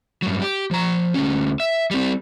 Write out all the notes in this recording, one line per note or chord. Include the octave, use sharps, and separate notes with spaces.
G2 F#3
G4
F3 A#5
D2 C#4
E5
G3 C4